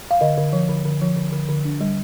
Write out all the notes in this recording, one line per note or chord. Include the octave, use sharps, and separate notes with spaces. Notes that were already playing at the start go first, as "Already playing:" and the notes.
F5
D3 D#5
D3
F3
D3
D3
F3
D3
D3
D3
D4
G3